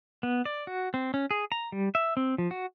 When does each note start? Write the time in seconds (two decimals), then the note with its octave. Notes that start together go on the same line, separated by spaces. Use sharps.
0.23 B3
0.46 D5
0.67 F#4
0.94 C4
1.14 C#4
1.31 G#4
1.52 A#5
1.72 G3
1.95 E5
2.17 C4
2.38 F3
2.51 F#4